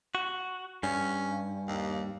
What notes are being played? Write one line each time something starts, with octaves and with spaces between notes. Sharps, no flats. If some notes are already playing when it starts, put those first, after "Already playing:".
F#4
G2 C#4
D#2